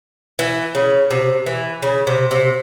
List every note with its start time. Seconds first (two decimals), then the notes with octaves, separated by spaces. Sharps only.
0.39 E3
0.75 C#3
1.11 C3
1.46 E3
1.82 C#3
2.07 C3
2.31 C3